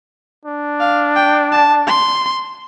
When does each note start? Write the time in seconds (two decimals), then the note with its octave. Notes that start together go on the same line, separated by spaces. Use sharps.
0.45 D4
0.80 F5
1.16 G5
1.52 A5
1.87 C6